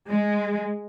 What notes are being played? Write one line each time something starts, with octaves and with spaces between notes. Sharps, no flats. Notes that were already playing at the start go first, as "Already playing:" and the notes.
G#3